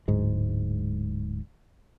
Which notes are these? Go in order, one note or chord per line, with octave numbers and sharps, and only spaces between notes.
D1 G#2 G#3